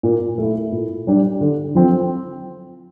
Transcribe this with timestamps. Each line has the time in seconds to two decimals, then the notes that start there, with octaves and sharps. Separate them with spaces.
0.03 A#2
0.38 A3 E4
0.72 A#2
1.07 G3 D4 G4
1.41 D3
1.75 F3 C4